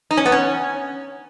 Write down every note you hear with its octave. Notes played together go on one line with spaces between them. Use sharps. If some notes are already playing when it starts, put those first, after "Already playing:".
D#4
C#4
B3
C#4